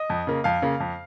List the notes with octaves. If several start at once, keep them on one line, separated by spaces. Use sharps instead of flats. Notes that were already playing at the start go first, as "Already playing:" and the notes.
Already playing: D#5
F2
C#3 A#3
F2 F5
C#3 A#3
F2